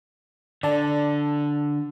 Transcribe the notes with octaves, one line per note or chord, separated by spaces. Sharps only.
D3 D5 A5